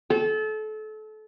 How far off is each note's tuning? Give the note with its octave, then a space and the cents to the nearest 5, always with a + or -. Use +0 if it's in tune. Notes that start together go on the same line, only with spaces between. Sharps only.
A4 -30